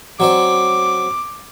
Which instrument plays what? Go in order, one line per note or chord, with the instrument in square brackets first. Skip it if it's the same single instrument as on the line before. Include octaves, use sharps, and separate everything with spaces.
[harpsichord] F#3 C4 D5 [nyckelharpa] D6